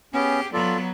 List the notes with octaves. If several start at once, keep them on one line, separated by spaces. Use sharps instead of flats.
B3 C#4 G4 G#4
F#3 B3 F4 A4 D5